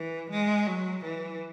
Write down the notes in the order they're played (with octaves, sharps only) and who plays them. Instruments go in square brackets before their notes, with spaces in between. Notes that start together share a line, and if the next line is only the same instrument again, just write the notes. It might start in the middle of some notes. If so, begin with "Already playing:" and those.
Already playing: [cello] E3
G#3
F#3
E3